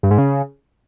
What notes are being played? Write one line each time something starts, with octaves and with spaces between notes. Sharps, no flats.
G2
G#2
C#3